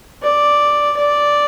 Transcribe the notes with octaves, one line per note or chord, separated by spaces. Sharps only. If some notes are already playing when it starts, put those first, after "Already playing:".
D5
D5